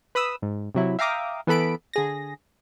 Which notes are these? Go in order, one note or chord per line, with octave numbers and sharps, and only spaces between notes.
B4 B5 D#6 E6
G#2
C3 F#3 E4
E5 F5 G5 A#5 D6 D#6
E3 B3 A4 B5 D7
D3 G#4 A#6